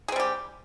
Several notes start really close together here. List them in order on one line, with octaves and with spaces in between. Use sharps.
G#4 C4 G3 G4